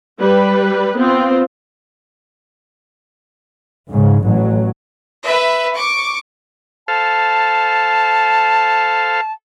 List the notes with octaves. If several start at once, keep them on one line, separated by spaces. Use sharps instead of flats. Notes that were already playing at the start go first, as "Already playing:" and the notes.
G3 B4
B3 C4 F4
G#2 C#3
A1 F#3
B4 E5
C#6 D6
A4 C5 F5 A5